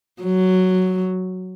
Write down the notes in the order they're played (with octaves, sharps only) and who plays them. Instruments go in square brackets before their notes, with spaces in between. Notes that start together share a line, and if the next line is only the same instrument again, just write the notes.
[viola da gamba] F#3